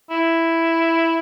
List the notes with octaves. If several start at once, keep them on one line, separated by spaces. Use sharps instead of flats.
E4